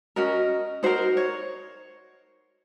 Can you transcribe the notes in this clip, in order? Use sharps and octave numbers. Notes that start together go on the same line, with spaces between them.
C#4 F#4 A#4 D#5
D#4 F#4 A#4 C5
C#5